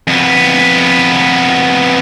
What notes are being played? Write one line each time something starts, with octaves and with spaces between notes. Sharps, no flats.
F2 B3